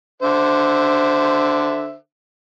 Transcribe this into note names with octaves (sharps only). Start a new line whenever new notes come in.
D3 C5 E5